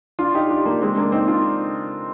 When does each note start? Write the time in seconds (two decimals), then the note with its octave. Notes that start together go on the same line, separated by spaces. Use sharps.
0.19 D4 F4
0.35 D#4 G4
0.50 D4 F4
0.65 A#3 D4
0.81 G#3 C4
0.97 A#3 D4
1.12 C4 D#4
1.28 D4 F4